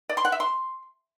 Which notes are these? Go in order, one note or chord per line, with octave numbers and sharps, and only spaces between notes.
D5
C6
F#5
E5
C6